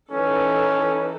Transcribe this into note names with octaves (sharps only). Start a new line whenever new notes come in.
E3 C#4 D#4 A4